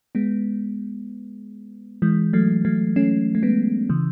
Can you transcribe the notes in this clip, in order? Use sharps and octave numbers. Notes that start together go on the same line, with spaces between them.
G#3 B3
E3 G#3
F#3 A3
F#3 A3
A3 C#4
A3
G#3 B3
C#3 E3